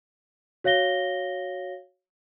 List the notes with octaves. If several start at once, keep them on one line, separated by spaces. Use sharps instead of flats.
F#4 C#5 F5 A#6 G7